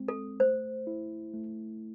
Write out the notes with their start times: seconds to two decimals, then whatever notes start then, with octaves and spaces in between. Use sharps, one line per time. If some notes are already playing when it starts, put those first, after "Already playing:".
Already playing: G#3 C4
0.08 A4
0.40 A3 C5
0.87 E4
1.34 A3